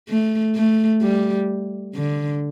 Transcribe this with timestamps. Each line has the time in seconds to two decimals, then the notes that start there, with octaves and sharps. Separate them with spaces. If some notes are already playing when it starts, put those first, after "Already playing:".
0.09 A3
0.56 A3
1.02 G3
1.95 D3